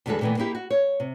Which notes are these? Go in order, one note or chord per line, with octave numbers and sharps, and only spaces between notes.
E2 D3 G3 G#3 F#4 A4
A#2 D#3 E3 A3 B3
A#3 D#4 E4 G4
F#4
C#5
C3